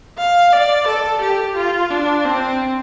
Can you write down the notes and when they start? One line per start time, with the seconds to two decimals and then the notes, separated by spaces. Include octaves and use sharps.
0.19 F5
0.53 D5
0.88 A4
1.22 G4
1.56 F4
1.91 D4
2.25 C4